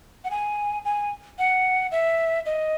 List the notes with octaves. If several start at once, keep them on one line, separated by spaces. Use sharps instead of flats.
F#5
G#5
G#5
F#5
E5
D#5